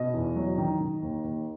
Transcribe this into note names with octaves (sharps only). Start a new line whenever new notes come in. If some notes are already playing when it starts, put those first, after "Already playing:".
Already playing: B2 D#5
E2
F#3
D#3
D#3
D#2
D#2